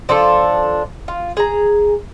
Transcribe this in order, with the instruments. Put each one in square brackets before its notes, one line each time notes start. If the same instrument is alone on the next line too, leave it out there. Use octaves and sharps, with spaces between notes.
[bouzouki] F3 D4 F4 A4
F4
G#4 A#5